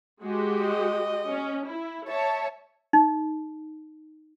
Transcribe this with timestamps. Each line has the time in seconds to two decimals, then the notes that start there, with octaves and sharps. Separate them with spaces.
0.22 G#3 F#4 G4
0.61 D#5
1.30 C#4
1.67 E4
2.08 C#5 E5 A5
2.93 D#4